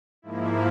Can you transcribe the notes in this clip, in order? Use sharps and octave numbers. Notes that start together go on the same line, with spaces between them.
G#2 F3 A#3 E4